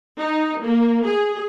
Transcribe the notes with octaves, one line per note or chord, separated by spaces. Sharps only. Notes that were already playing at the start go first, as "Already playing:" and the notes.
D#4
A#3
G#4